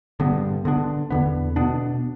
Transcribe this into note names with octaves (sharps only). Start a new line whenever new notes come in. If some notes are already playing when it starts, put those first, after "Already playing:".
G2 D3 B3
D3 B3 D4
E2 D3 B3
B2 B3 D4